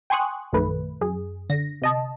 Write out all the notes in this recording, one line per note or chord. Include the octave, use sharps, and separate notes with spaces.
G5 G#5 C6 C#6 D#6 F#6
A#1 F#2 D#3 A3 B4
F#2 G#4
D3 A#6
C3 D#5 A5